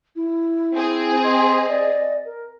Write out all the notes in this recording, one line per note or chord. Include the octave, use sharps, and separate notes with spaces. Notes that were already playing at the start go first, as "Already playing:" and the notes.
E4
C4 G#4
D#5 C6
D5
A#4